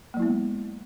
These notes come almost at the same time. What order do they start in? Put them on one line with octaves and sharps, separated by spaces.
A#3 F#3 E4 B3 G#3